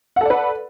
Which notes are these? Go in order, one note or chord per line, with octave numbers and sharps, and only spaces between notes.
A4 B4 D5 F#5